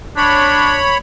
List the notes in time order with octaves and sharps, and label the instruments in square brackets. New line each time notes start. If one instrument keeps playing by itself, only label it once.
[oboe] D4 [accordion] C#5 B5